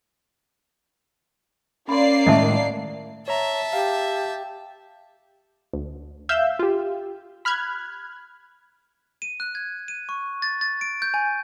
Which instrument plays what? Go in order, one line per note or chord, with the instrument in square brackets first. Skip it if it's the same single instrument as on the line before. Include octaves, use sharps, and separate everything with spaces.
[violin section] A#3 D5 C7 [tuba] C#4 [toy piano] B5 C6
[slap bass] A2 D#3 G#3 [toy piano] D#5 E5 A5
[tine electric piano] C#5 A#5 [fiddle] E5 A5
[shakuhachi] G4 [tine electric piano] F5
[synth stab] D2
E5 F5 E6 G6
F4 G4
B5 F6 F#6 G#6
[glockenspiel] D#7
F#6
G#6
D#7
C#6
A6
A6
D7
G6
G#5